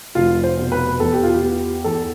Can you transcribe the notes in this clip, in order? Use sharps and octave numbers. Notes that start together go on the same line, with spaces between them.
F1 F4
C5
B2
B4
E2 A4
G4
F4
G4
B3
E2 A4